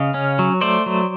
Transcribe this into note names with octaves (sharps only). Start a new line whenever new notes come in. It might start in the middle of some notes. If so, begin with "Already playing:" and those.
Already playing: C#3 D#5 F5
C#4
F#3
A3 C5 D5
F#3